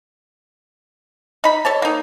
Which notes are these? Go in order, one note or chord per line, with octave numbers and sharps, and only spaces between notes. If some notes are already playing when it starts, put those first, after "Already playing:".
D#4 B5
A4 C#5 A5
A#3 D#4